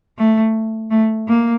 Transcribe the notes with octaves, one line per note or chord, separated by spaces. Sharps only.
A3
A3
A#3